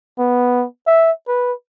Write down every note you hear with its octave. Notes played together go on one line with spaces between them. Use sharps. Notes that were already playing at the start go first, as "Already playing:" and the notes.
B3
E5
B4